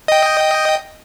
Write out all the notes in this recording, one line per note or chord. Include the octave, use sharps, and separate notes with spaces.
D#5 G5